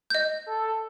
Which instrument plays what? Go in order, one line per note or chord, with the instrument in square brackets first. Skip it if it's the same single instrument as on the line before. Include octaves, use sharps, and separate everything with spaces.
[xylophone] D#5 G6
[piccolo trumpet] A4